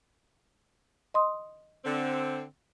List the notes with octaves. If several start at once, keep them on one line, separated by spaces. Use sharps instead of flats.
D#5 C6 D#6
D3 C4